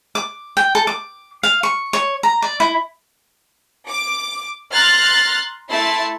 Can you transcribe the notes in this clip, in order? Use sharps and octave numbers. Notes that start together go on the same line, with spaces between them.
D6
G5
A4
D6
F5
C#6
C#5
A#5
D5
E4
D6
A#5 C6 F6 F#6 A6
A3 E4 E5 A5 C6 A6